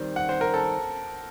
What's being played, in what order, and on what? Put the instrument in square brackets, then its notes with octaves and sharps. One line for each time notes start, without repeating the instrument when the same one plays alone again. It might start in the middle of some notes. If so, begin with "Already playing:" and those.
Already playing: [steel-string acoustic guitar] D#3 G3 C4
[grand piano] F#5
C5
A#4
A4